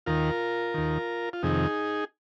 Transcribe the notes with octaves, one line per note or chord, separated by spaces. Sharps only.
D#2 D#3 F4 A#4
D#2 D#3
F4
F2 C3 D#3 D#4 G#4